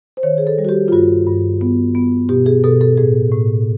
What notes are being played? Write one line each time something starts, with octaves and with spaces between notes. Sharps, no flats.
C5
D#3 C#5
G#4
A4
G3
F#4
G4
F4
G2 F#4
G2
B3
B3
B2 G4
G#4
B2 A4
A4
A2 G#4
A2